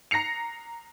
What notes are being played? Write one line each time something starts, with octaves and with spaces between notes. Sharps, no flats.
A#5 A#6 C7 C#7 F7